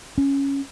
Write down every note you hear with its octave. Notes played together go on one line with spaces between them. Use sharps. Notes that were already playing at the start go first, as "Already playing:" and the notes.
C#4